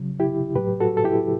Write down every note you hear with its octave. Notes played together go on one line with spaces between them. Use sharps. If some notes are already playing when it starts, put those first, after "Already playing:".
Already playing: C#3 F#3
E4 G4
A2 F#3 G4 B4
F#4 A4
A4
E4 G4